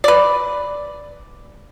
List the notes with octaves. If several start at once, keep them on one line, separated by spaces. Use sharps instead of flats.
B4 D5